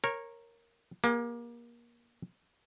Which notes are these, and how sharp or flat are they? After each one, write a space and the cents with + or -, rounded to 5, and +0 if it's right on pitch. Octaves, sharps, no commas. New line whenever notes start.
A#4 +0 C#5 -20
A#3 +25 G#4 -35